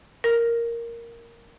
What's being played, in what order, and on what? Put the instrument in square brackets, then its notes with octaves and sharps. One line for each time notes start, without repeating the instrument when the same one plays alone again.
[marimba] A#4